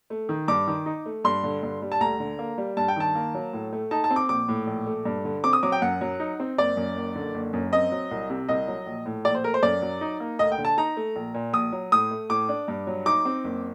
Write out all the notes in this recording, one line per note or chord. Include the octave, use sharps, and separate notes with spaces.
A3
D#3
G2 D6
D#3
D#4
A3
G2 C6
D3
G2
G3
A5
D2 A#5
D3
A#3
G3
G2 A5
G5
D#3 A5
A#3
F#3
A2
A3
D#4 A5
A5
C4
D6
A#1 D6
A2
A#1
A3
G2
D3
C4 D6
D#6
F#3 D6
G5
F#2 F#5
F#3
D#4
C4
F#1 D5
F#2
F#1
D3
F#1
F#2
C4 D#5
F#3
C2
C3
C2 D#5
F#3
A#1
A2
A#1 D5
C5
A3 A#4
C5
F#2 D5
F#3
D#4
A#3
D2 D#5
G5
D3
A5
D#4 A#5
A3
A#1
A#2
A#1 D#6
F#3
A2 D#6
A3
A2 D6
D4
G2
F#3
D#4 D6
C4
F#1